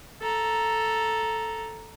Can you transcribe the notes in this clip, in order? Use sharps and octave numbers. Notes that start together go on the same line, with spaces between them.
A4 A#5